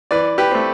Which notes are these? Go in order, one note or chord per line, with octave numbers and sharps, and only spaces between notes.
E3 B4 D5
G4 B4
A3 C4